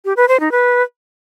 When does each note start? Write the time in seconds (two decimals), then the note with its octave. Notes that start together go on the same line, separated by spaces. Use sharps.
0.05 G4
0.17 B4
0.28 C5
0.40 D#4
0.52 B4